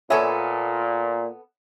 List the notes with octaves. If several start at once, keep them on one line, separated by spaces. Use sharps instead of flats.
A#2 B3 A4 C#5 E5 G#5